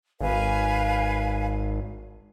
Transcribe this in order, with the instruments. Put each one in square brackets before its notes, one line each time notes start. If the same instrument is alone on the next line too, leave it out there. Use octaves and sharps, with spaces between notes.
[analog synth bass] G#1 [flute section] B4 F5 G#5